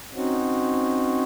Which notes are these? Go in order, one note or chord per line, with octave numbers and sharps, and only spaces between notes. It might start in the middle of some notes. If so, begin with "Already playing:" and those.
C4 C#4 D#4 F#4